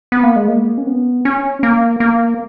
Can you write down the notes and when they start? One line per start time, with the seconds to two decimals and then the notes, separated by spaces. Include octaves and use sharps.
0.12 B3
0.23 A#3
0.36 G#3
0.48 A#3
0.78 C#4
0.87 B3
1.25 C#4
1.63 A#3
2.00 A#3